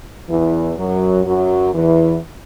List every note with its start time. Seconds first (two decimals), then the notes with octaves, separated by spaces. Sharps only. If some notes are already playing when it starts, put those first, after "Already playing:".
0.29 E2 E3
0.78 F#2 F#3
1.25 F#2 F#3
1.74 E2 E3